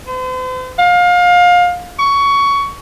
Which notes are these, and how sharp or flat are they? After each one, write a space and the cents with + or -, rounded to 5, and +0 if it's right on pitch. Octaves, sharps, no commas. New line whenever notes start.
C5 -45
F5 +25
C#6 +15